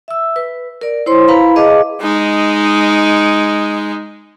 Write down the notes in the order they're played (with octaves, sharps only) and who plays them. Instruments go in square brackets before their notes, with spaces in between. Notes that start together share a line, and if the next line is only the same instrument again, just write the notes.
[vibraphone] E5 E6
B4
A#4 D5
E4 C5 C#5 C6
E4 B4 F5 A#5 B5
G#4 B4 D#5 F5 A5 D6
[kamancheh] G#3 D#4